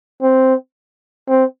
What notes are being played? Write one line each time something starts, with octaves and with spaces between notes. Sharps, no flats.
C4
C4